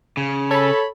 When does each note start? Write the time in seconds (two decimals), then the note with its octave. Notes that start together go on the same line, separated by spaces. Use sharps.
0.17 C#3
0.50 A4 C#5 B5